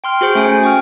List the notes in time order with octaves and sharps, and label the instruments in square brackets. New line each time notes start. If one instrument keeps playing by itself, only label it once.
[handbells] G5 C6 F6
F#4 G#4 C5 C#7
A3 C#4 G#5 D7
C#4
G5 C#6 F6